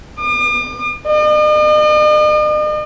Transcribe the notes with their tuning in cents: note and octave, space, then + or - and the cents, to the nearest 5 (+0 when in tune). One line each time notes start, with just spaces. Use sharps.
D6 +45
D#5 -45